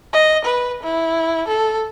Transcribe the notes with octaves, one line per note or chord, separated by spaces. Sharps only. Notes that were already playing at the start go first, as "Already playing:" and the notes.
D#5
B4
E4
A4